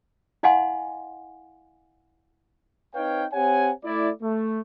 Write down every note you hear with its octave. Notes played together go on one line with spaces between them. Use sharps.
E4 D#5 F5 F#5 G#5 C6
C4 D#4 B4 C#5 F5 G5
C4 G4 C#5 F#5 G#5
A3 E4 D5
A3